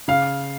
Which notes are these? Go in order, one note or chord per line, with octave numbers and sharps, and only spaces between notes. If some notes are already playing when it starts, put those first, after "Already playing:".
C#3 F5